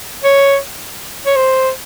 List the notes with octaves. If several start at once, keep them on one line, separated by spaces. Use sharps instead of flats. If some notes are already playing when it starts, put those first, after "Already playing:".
C#5
C#5
C5